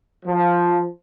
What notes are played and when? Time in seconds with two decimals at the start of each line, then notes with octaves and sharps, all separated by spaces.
0.26 F3